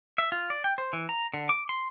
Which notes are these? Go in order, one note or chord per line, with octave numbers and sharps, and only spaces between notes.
E5
F4
D5
G5
C5
E3
A#5
D3
D6
C6